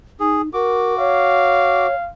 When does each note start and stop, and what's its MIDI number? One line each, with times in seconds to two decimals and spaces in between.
0.20 0.49 63
0.20 0.42 68
0.54 1.87 66
0.54 0.97 70
0.54 1.87 86
0.99 1.95 73
0.99 2.10 77